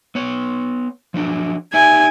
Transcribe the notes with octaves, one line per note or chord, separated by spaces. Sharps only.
B3 C#5
F3 F#3 D4
D#4 G4 E5 G#5